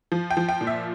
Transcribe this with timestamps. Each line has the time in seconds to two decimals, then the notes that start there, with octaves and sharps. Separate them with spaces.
0.12 F3
0.30 G5
0.37 F3
0.49 G5
0.61 A#2
0.67 E5